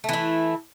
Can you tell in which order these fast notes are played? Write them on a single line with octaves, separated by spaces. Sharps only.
A3 E3 E4